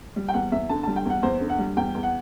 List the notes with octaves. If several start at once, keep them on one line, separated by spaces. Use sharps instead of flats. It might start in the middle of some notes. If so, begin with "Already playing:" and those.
G3
G5
E2 F#5
E2 E5
D3 A5
G3 A5
G5
E2 F#5
E2 C5
D3
F#5
G3
E2 G5
E2
F#5